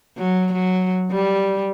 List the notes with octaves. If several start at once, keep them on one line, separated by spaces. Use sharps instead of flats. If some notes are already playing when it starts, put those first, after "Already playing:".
F#3
F#3
G3